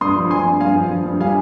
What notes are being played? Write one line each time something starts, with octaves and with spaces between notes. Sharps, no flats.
G2 C6 D#6
F3
G2 G#5 C6
G2
G2 F5 G#5
F3
F3
G2
G3 F5 G#5